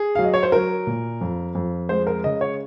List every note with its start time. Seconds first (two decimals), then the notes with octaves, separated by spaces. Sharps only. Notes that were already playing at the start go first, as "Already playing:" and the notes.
Already playing: G#4
0.15 F#3 F5
0.24 D#5
0.34 C#5
0.43 C5
0.52 F#3 A#4
0.87 A#2
1.21 F2
1.55 F2
1.89 G#3 C5
2.07 A#4
2.24 C#3 D#5
2.41 C#5